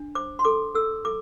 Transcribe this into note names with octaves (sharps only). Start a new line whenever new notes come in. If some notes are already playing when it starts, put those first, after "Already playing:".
Already playing: D4
C5 D6
C6
A4 D6
A4 E6
A4 D6